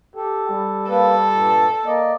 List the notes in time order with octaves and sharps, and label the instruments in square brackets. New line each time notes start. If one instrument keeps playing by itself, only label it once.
[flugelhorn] G4 [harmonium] A4
[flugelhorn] G3
[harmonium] A#3 B4 [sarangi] A4
[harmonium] G2 A#2 A5
[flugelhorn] A#3 [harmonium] D5 D#5